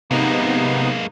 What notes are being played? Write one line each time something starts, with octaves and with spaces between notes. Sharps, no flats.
C3 G#3 A#3 B3 D#4